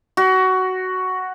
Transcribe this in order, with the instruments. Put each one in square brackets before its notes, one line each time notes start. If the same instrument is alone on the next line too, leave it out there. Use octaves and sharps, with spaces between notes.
[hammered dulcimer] F#4